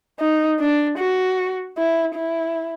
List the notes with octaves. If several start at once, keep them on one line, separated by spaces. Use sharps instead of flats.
D#4
D4
F#4
E4
E4